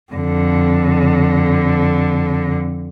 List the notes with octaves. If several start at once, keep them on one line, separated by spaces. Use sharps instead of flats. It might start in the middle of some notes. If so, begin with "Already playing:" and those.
F2 D3